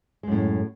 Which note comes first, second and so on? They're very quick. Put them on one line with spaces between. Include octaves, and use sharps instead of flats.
G#3 F#2 A2